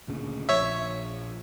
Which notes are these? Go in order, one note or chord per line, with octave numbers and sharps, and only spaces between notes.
D2 A#2 C#3
A#1 F3 C#5 E5